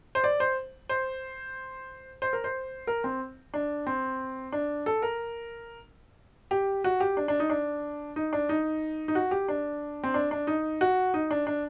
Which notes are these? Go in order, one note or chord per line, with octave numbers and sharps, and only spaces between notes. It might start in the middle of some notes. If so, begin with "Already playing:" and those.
C5
D5
C5
C5
C5
A#4
C5
A#4
C4
D4
C4
D4
A4
A#4
G4
F#4
G4
D4
D4
D#4
D4
D#4
D4
D#4
D#4
F#4
G4
D4
C4
D4
D4
D#4
F#4
D#4
D4
D4